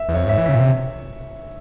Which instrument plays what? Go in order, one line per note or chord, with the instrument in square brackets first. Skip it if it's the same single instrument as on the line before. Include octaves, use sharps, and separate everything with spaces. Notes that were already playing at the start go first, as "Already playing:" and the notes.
Already playing: [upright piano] E5
[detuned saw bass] E2
[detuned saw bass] F2 [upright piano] C#5
[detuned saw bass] G#2 [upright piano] E5
[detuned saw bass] E3
[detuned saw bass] C#3 [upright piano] E5
[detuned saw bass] A#2
C3